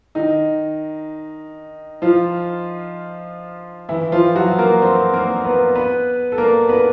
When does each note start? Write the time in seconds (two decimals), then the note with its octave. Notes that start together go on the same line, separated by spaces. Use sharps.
0.15 D#3 D#4
2.02 F3 F4
3.89 E3 E4
4.12 F3 F4
4.35 F#3 F#4
4.58 A#3 A#4
4.82 C4 C5
5.13 A#3 A#4
5.45 B3 B4
5.75 B3 B4
6.32 A4
6.38 A#3 A#4
6.69 B3 B4